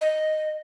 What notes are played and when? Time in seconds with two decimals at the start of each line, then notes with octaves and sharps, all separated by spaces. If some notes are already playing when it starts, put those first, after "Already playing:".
0.01 D#5